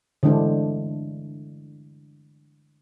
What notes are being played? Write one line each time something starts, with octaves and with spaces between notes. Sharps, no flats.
D3 E3 G#3 D4 E4 C5